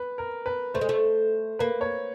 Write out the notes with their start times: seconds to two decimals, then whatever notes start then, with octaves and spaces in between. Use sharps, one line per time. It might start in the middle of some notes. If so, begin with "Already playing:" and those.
Already playing: B4
0.18 A#4
0.46 B4
0.74 A3 C5
0.81 G#3
0.89 A3
1.59 A#3 B4
1.81 C#5